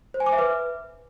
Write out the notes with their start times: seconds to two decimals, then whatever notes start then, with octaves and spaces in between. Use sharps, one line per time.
0.14 C5
0.20 G#5
0.26 D6
0.32 E5
0.39 B4